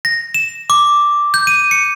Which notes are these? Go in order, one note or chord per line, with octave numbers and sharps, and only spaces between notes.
A#6
E7
D6
G6
D#7
C#7